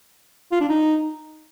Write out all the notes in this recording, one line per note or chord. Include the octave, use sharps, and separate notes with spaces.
F4
D4
D#4